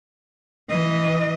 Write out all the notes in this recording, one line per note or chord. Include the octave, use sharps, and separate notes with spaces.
E3 D#5